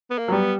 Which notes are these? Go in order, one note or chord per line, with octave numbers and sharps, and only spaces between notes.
B3
A#3
F#3
G3 B3